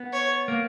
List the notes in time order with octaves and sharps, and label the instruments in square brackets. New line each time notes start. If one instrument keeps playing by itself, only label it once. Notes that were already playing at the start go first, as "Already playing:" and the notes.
Already playing: [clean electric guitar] B3
[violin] C#5
[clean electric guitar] A#3